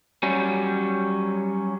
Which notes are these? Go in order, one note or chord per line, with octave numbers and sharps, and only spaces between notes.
F#3 G3 C#4